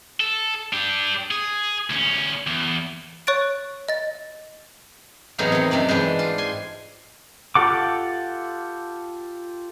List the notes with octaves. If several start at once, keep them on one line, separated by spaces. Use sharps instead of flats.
A4
D4 G4
G#4
D2 C#4
E2
C#5 C#6 F#6 A6 D7
D#5 A6
E2 A2 F#3 C4 D#4 A#4
C3 D#3
F#2 C3 A3 D5
G#2 E3 D4 G5
F4
G#5 C6
F4 G4 A4 F#5 D6